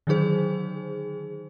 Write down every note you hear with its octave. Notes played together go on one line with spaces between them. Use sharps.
D3 D#3 F#3 D#4 G#4 C5